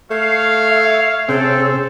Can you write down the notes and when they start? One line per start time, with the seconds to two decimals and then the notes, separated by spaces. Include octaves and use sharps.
0.11 A3 C#5 F5
0.69 E5
1.29 C3 C4 C#4 G#4 A4